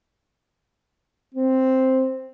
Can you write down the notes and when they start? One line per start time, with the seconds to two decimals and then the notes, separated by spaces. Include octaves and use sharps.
1.34 C4